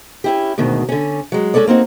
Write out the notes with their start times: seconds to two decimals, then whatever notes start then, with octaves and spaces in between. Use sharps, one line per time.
0.24 C#4 E4 G4
0.58 D2 G#2 B2 D#3
0.89 D3 C#4
1.32 F#3 G#3
1.54 G#3 C#4 A4 C#5 D5
1.67 A#3 C4 D#4 F#4